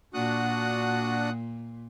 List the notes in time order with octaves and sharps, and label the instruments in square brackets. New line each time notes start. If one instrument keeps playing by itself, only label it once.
[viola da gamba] A#2 [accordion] D4 F#4 [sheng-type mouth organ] F#5 D#6 F#6